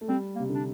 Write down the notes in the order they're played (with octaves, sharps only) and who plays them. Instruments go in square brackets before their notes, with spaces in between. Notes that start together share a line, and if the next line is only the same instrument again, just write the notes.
[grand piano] A3
[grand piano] G3 [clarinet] C4
[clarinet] A#3
[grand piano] C3
D3
[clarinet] D4